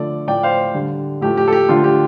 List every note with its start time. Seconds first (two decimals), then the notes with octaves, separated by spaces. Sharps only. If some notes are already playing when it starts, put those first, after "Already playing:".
Already playing: D3 F3 A3 A4 D5
0.27 A2 F3 A3 D5 G5
0.43 C5 F5
0.75 D3 G3
1.21 A2 F3 A3 G4
1.37 G4
1.48 A4
1.53 G4
1.69 D3 F3 A3 F4
1.84 G4